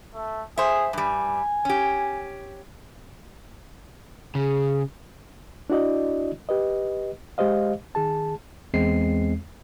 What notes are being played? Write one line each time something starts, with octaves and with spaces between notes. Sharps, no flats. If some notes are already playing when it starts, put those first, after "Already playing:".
A3
G#4 C5 E5
G2 G3 G#5
C#4 G4
C#3 G#4
D4 E4 F#4 D5 D#5
G4 B4 D#5
G#3 G4 C5 D#5 F5
D#3 G#4 A5
E2 G#3 C4 C7